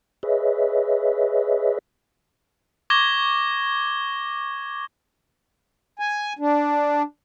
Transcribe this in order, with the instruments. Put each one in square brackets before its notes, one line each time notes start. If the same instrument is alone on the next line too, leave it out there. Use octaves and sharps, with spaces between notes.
[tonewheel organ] G#4 B4 C#5 D#5 E5
[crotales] C#6 D6 G#6 A#6 G7
[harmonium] G#5
D4